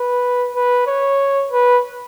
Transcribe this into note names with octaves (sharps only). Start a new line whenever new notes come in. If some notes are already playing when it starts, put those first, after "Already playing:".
Already playing: B4
B4
C#5
B4